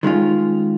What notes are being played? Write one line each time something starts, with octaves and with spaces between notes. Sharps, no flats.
D#3 G#3 C#4 F4